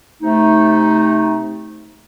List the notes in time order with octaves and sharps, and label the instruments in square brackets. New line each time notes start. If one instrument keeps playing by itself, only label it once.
[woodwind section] C3 A3 D#4